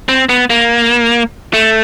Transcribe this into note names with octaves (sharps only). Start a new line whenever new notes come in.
C4
B3
A#3
A3